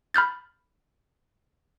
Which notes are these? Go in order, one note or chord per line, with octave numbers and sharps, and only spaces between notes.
B5 F6 G6 A6